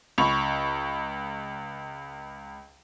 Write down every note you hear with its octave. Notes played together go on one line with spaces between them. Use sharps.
C#2 B5 C#6 F7